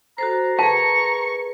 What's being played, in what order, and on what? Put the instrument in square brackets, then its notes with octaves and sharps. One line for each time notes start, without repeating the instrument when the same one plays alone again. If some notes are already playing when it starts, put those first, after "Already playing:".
[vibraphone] F#4 A4 C5 [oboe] A#5
[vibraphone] G#4 A#4 B4 [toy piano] A5 [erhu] C#6